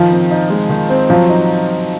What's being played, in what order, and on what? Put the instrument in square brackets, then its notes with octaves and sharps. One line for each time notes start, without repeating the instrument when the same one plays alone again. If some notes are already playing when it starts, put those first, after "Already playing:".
Already playing: [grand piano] D#3 [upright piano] F3
[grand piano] C4
D#4
G#3
D#3
C4
[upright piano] F3 [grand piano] F#3
[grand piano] D#4